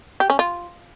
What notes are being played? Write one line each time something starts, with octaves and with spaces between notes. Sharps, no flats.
G4
C#4
F4